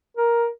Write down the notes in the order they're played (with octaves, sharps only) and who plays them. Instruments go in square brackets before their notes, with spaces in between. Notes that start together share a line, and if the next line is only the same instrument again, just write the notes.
[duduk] A#4